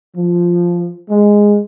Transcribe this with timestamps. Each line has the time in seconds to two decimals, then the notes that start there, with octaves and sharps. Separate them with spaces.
0.16 F3
1.10 G#3